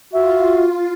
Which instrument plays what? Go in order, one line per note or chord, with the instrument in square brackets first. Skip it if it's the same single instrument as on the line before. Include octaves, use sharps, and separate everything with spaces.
[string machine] F4 [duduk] F#4 [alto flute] E5